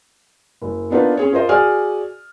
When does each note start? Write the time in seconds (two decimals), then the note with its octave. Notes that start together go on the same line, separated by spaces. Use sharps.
0.62 F#1
0.90 A#3 B3 D4 D#4 F4 B4
1.17 C#4 G#4 C#5
1.33 F4 A#4 C5 D#5
1.49 F#4 G#4 D5 G#5 D#6 F6